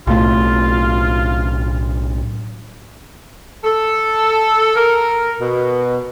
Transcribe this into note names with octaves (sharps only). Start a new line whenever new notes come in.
B1 A2 A3 F4
A4
A#4
B2